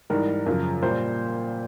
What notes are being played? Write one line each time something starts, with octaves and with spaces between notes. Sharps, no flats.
G#2 E3 G3 A#4
F#2 C#3 F3
A#2 G3 C5